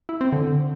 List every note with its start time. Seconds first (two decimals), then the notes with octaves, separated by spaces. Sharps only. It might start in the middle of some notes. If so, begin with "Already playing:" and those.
0.09 E4
0.21 C4
0.32 D3